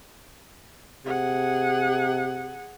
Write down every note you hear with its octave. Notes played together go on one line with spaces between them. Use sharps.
C3 G#4 F#5